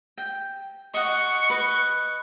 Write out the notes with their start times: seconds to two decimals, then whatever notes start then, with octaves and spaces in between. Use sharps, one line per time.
0.18 G5
0.94 D#5 F#5 C#6
1.50 B4 D#5